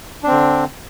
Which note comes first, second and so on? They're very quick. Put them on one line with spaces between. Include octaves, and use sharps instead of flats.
D4 C4 D3